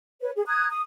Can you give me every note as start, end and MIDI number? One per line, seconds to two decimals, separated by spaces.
0.21 0.30 71
0.21 0.30 73
0.36 0.44 68
0.47 0.68 82
0.47 0.68 87
0.47 0.68 90
0.47 0.68 92
0.70 0.82 87